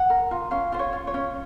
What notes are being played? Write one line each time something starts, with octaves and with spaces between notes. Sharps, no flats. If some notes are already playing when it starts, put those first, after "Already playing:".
Already playing: F#5
A#4
F4
C#4 F5
F4 C5
C#5
F4
C#5
C#4